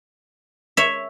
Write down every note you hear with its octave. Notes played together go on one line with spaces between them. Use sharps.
C#5 E5